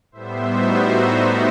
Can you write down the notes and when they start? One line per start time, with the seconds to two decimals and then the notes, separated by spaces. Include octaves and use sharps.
0.12 A2 G3 B3 C5 E5
0.45 D#4 F#4
0.77 D#4
1.10 E4